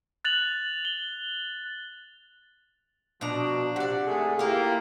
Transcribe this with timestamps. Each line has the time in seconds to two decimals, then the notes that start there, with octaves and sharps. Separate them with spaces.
0.25 F#6 A6 F7 F#7
0.85 G7
3.21 B2 F3 D4 A#5
3.76 C3 D5 F#5
4.06 G#2 A3 G#4
4.39 A#3 E4 F4 G4